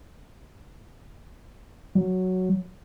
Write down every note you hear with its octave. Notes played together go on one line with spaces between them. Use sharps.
F#3